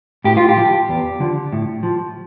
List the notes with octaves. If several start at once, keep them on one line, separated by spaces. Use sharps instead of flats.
A2 G4
F4
G4
F3
E2
D3 F3
A2
F3